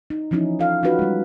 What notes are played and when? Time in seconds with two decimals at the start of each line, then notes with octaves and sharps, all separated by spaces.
0.10 D#4
0.31 E3 F3 C#4 D#4 E4
0.59 F4 A4 F5
0.83 C#4 D#4 F4 F#4 B4
0.99 G3 G#3